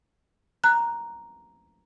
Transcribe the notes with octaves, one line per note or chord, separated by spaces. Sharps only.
A#5 F#6